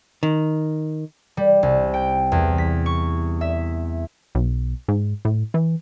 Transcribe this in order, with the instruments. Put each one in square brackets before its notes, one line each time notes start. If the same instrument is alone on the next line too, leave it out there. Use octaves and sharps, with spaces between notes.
[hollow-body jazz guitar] D#3
[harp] G3
C2
G5
E2
B6
C#6
E5
[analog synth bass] B1
G#2
A2
E3